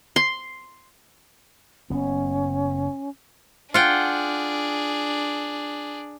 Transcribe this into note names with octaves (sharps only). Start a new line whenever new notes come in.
C6
F#1 B3 C#4
D4 F4 G#4 F#5 G5